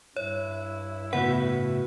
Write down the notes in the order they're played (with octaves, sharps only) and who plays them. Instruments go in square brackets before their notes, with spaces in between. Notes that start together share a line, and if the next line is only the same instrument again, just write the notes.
[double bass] G2 E4 [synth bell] C#5
[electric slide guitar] A2 C#3 B4 [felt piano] B3 F#4 [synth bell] F#5